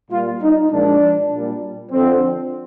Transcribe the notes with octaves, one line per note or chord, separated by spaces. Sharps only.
A#2 G3 F4
D#4
A#2 F3 G#3 D4
A#2 G3
F2 D3 F3 C4